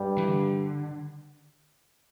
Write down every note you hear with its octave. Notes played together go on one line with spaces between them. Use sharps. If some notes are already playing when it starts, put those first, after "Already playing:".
Already playing: G2 G3
E3
D3